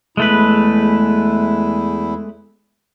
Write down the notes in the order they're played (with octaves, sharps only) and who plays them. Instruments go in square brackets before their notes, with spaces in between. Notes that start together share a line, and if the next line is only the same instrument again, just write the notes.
[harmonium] E2 E4 [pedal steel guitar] G#3 A3 B4